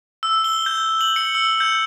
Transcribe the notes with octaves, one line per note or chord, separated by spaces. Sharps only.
E6
G7
G6
F#7
C#7
E6
G6